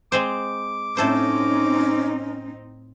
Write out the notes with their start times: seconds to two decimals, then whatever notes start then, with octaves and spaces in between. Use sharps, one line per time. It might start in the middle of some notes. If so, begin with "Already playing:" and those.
0.12 G#3 C4 C5 D6
0.97 A2 C4 C#4 D#4 A4 C5